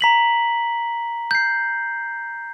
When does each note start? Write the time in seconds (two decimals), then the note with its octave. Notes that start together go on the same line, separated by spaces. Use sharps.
0.01 A#5 B6 F#7
1.31 G6 C7